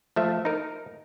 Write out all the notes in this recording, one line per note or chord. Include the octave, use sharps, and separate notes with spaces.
F3 A3 E5
D#4 A#4